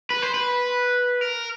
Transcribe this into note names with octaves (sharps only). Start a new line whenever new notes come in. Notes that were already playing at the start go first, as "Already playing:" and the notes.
B4
C5
B4
A#4